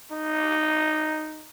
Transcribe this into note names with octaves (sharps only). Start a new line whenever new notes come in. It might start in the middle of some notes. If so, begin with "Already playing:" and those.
D#4